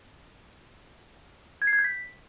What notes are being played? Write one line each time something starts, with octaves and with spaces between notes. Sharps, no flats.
G#6
C7
G#6
G6
B6